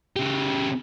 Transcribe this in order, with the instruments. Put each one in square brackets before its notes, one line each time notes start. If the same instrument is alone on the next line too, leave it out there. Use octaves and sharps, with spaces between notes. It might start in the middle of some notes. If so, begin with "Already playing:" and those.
[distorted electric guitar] C#3 G4